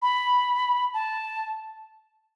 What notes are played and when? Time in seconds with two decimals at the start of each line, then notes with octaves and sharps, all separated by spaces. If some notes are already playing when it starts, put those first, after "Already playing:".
0.02 B5
0.94 A5